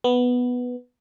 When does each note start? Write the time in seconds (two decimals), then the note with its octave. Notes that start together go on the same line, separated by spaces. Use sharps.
0.04 B3